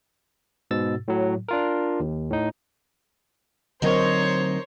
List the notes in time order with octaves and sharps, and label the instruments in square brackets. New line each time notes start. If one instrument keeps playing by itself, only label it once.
[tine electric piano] G#2 B2 E6 A6
A2 F#3
D4 F4 A#4
D#2
A2 D#4
[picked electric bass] D3 F#3 C4 [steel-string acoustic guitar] D#4 A#4 D#5 [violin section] C5 C#5